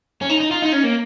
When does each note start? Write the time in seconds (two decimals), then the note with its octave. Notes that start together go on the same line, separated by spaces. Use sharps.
0.21 C#4
0.29 D#4
0.40 D#4
0.51 F4
0.62 D#4
0.72 C#4
0.84 A#3